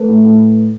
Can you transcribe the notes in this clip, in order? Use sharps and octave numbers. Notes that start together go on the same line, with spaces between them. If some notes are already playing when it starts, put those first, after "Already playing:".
Already playing: A3 B4
A2
A2